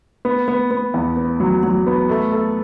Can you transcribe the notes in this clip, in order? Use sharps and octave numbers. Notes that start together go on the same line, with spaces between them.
B3
B3
B3
E2
B3
F#3
F#3
B3
A3
A4